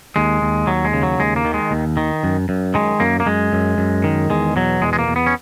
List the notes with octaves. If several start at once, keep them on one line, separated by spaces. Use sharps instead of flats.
D#2 G#3
D#2
D#2 F#3
G#3
C#3
F#3
D#2 G#3
A#3
D#3
G#3
D#2
D#3
F#2
F#2
D#3 G#3
F#2 A#3
A#3
F#2 G#3
F#2
F#2
D#3
E2 G#3
B2 F#3
E2 G#3
G#3
A#3
E2
B3
C#4